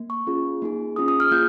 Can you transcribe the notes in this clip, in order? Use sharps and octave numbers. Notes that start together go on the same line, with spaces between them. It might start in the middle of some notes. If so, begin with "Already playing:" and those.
Already playing: A#3
C#6
C#4 F4 G#4
A#3 D#4 G#4
C#4 F4 G#4 D#6
D#6
F6
A#3 F4 G#4 G6